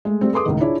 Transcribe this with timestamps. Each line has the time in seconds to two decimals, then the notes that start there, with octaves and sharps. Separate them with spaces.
0.05 G#3 A3
0.21 G3 A3 C4
0.33 G#4 A4 B4 C6 D6 D#6
0.46 C#2 A2 D#3
0.60 D4 E4 F4 G#4 C#5 D5